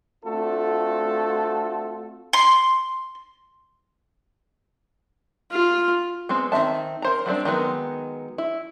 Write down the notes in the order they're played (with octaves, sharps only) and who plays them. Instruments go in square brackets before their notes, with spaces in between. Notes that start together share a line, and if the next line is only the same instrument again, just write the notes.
[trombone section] A3 C4 D4 F4 F#4 A4
[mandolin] C6
[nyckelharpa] F4
[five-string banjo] G#3 B3 C4
D#3 C4 A4 E5 A5
A#4 C5 A#5
F#3 G3 C4 D4
D#3 F#3 G#3 B3 A#4
E4